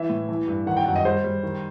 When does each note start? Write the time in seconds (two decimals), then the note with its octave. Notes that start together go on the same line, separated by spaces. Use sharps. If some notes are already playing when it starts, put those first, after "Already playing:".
Already playing: E3 E5
0.09 A2
0.29 E3
0.48 G2
0.67 D#3 F#5
0.77 G5
0.86 F#2 F#5
0.96 D#5
1.05 G3 C5
1.24 G3
1.43 D#3